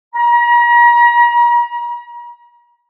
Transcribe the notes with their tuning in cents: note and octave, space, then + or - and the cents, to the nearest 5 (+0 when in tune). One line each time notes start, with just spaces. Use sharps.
A#5 +40